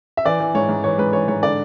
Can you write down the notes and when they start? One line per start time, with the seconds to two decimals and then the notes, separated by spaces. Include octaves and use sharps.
0.17 E5
0.25 E3 D5
0.40 E3
0.55 G#2 C#5
0.69 G#2
0.84 E3 C#5
0.98 G#2 B4
1.13 E3 C#5
1.28 G#2 C#5
1.43 D3 D5